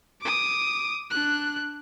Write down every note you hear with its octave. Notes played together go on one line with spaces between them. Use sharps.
D6 D#6
D4 F#6